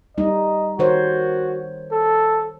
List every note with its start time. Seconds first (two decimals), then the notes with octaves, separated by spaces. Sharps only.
0.18 G3 D#4 D#5
0.79 D#3 F#4 C5 C#5
1.92 A4